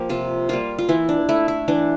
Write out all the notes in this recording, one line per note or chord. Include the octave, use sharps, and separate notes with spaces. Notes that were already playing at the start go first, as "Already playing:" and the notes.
Already playing: F3 A#3 G4
C3 F4
G3 A#3 F4
F4
E3 E4
D4
A3 E4
E4
E3 D4